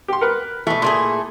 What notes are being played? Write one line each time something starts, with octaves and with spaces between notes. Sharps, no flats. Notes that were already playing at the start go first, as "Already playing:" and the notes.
G4 C6
A#4 B4
B2 E3 A3
A#2 A3 G#4